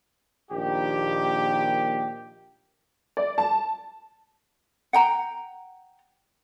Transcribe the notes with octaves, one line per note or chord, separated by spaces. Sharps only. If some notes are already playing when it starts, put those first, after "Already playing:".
A#1 D#3 A#3 G4
D5
A5
F#5 G5 A#5